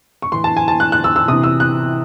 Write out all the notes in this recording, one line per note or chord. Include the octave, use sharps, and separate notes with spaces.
C#6
A2 E3 C6
A5
G#5
A5
F#6
F#6
E6
E6
C3 E3 D#6
E6
F#6